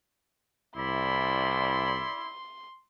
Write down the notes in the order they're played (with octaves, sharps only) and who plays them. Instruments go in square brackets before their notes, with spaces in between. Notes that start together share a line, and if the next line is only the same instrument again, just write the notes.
[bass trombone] C2 [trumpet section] E4 D5 B5 [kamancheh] C6